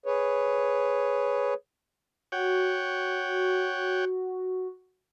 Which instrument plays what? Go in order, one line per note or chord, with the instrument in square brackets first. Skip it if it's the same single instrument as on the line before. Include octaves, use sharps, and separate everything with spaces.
[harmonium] G#4 B4 C#5
[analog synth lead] F#4 [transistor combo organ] C#5 F#5 G5